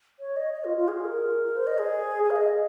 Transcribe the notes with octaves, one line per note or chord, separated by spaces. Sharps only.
C#5
D#5
D#5
F4
F4
G#4
A#4
C5
D#5
G#4
G#4
F5
D#5